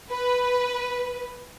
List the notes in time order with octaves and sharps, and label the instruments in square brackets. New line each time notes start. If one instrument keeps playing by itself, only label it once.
[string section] B4